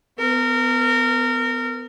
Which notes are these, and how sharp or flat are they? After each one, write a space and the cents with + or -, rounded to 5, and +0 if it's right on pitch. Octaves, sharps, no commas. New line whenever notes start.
B3 +30 A#4 -25